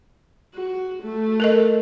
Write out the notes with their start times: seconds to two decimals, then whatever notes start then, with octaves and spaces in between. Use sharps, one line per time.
0.54 F#4
1.03 A3
1.40 A4 A#4 D#5